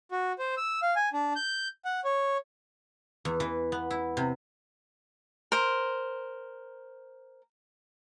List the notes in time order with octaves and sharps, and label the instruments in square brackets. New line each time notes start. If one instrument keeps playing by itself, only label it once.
[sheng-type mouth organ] F#4
C5
E6
F5
G#5
D4
G6
F#5
C#5
[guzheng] E2
E3
B3
E4
C3
[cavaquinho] A#4 C5